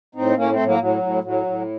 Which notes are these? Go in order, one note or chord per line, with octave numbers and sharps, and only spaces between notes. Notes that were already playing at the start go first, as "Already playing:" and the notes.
A2 C4 D#4
A2 A#3 C#4
A3 C4
A2
F#3 A#3
A2 F#3
A2
A2 F#3
A2